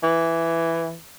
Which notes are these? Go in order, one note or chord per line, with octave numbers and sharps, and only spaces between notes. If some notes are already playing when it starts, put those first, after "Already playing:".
E3